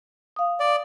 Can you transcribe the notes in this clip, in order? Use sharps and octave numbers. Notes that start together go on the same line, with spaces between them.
F5 D#6
D5